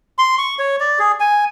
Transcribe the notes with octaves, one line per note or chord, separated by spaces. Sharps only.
C6
C#6
C#5
D5
G#4
G#5